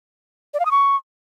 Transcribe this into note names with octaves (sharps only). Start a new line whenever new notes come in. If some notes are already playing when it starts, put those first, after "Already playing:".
D5
F5
D#6
C#6